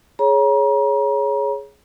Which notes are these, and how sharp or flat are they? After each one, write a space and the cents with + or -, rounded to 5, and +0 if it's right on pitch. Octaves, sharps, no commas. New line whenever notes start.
G#4 +10 C#5 +0 A#5 +35